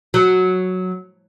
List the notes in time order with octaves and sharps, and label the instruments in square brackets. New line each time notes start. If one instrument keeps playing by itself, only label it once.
[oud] F#3